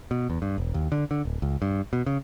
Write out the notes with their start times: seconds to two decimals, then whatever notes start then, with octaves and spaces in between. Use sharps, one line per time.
0.11 B2
0.30 E2
0.42 G2
0.58 E1
0.74 D#2
0.92 D3
1.11 D3
1.25 D1
1.42 C#2
1.62 G2
1.93 B2
2.06 C#3